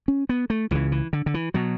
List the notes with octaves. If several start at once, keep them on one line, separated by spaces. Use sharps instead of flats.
C#4
B3
A3
C#2 C#3 E3
E3
D3
D3
E3
B2 F#3